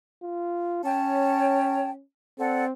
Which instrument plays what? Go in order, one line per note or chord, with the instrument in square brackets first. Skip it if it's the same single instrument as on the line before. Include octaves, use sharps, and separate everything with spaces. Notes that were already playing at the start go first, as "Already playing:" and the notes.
[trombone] F4
[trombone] C#4 [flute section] C#5 G5 A5
[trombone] C4 [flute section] A4 D5 F#5